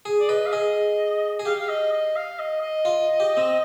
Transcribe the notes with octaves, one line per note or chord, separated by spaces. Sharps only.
G#4
D5
B4 D#5
F5
G#4 D#5
G#4
G4 F5
F5
D#5
D#5
F5
D#5
D#5
F4
G4
C4